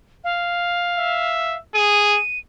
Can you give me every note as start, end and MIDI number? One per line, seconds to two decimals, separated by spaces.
0.24 1.57 77
0.98 1.58 76
1.74 2.19 68
1.74 2.39 99